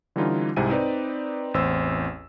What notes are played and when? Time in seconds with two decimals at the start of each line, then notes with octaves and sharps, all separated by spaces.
0.16 D3 E3 G3 C#4 D#4 F4
0.56 C2 G#2 C3 E4 G#5 D#7
0.70 C4 D#4 B4 D5
1.54 A1 E2 C4 C5 E6